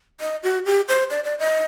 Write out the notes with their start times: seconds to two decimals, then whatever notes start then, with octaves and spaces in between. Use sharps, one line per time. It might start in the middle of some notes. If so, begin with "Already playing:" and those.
0.21 D#5
0.43 F#4
0.66 G4
0.88 C5
1.10 D5
1.24 D5
1.39 D#5